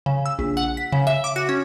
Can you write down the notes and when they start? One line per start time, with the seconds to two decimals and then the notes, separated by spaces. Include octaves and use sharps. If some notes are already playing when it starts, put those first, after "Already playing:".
0.06 C#3
0.26 E6
0.39 A#1
0.57 F#5
0.77 B6
0.92 C#3
1.07 E5
1.24 D6
1.36 F#4
1.49 C#4